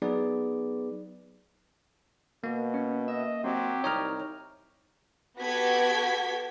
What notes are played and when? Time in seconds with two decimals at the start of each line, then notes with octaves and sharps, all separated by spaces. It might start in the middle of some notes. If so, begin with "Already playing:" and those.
0.02 F#3 B3 D#4 G#4 B4 D5
2.44 B2 A#3
2.74 C#4
3.08 D#5 E5
3.44 F#3 C4 G4
3.84 C2 D#4 C#5 A#5 F6
5.39 B3 F#4 G4 A4 G#6 B6